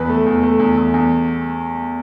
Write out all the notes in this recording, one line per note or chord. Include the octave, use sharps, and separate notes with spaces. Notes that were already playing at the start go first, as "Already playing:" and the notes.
Already playing: E2 B4
A3
E2
A3
E2
E2
E2